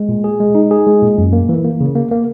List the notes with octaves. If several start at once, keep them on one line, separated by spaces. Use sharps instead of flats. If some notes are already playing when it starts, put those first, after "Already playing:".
Already playing: G#3
A#2
G#4
G#3
D#4
G#4
G#3
A#2
F#2
A#3
E3
A#3
C#3
A#3
A#3